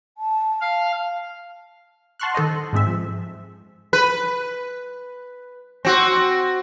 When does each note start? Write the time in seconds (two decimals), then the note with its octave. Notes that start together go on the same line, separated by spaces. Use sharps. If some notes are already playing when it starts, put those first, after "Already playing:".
0.18 A5
0.61 F5
2.19 F#5 A5 C6 C#6 F6 F#6
2.34 D#3 A4 C5 D#5
2.73 G#2 G#3 C4 E5
2.87 F3
3.93 B4
5.85 C4 F#4